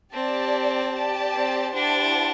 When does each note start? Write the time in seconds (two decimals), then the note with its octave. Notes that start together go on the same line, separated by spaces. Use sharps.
0.13 C4 G4 D5 A5
0.93 G4 D5 A5
1.34 C4
1.74 D4 E4 G4 C5 F#5 A5